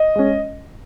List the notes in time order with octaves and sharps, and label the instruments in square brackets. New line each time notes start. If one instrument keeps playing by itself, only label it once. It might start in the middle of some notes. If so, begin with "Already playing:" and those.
Already playing: [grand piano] D#5
G#3 C#4